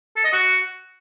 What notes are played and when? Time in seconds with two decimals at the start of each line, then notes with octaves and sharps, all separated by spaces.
0.16 A4
0.25 D#5
0.33 F#4